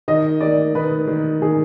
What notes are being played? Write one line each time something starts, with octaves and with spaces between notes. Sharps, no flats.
D#3 D#5
D#3 D5
D#3 B4
D#3
D#3 G#4